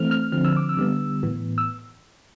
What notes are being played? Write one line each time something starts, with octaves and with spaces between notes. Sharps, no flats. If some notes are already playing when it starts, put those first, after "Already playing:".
Already playing: E3 A3 C4 F6
F6
D3 F3 C4 F6
E6
D6
E6
D3 G3 B3
A2 E3 B3
E6